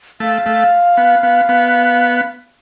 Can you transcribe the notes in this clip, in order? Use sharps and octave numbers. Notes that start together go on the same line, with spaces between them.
A3 F5
A3
B3
B3
B3